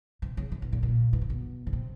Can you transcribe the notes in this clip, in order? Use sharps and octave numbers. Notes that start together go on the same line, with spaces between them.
C3
C#3
C3
B2
A#2
A#2
B2
C3
B2
C#3
C3